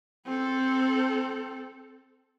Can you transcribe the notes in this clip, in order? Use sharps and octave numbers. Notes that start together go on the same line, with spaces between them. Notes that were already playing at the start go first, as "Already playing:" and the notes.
C4 A4